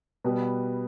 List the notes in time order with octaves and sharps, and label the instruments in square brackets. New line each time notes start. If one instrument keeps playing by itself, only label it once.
[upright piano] B2 G3 B3